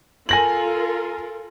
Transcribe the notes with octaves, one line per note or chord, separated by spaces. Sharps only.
F4 A4 A#4 G#5 A#6 F#7